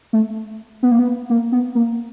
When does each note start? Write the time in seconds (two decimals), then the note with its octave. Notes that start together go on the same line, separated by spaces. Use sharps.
0.13 A3
0.83 B3
0.91 A#3
0.99 B3
1.30 A#3
1.52 B3
1.75 A#3